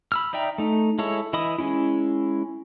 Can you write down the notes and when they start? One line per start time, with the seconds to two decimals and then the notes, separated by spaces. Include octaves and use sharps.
0.12 B5 E6 F6
0.33 D#4 D5 E5 G5 A#5
0.58 A3 D#4
0.99 G#3 E4 A4 C#5
1.33 E3 E4 D#5 B5 D#6
1.58 G#3 C#4 E4